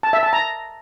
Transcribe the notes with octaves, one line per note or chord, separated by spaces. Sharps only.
A5
E5
A5
A#5